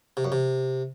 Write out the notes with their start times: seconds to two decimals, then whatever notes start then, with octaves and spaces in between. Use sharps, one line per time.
0.17 C3
0.24 F#2
0.32 C3